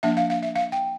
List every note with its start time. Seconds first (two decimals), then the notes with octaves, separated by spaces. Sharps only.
0.03 F3 A#3 D4 E5
0.17 F5
0.30 F5
0.43 E5
0.56 F5
0.72 G5